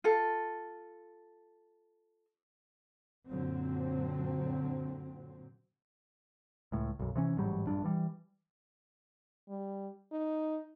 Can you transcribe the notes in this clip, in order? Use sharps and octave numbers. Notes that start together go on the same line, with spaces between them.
F4 A4
F#2 A#2 D3 F#3 C4
C#2 A2
B1 F#2
C3 E3 C#4
A1 G#2 F#3 G3
A#1 G2 D4
E3 G3
G3
D#4